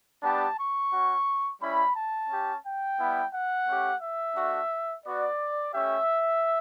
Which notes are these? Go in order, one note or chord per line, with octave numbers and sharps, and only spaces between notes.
G3 B3 D4 G4 A5
C#6
C#4 F#4
G3 C#4 E4 B5
A5
C#4 G4
G5
G3 B3 E4
F#5
A3 C#4 G4
E5
A3 D4 F#4
B3 F#4 D5
A3 C#4 G4 E5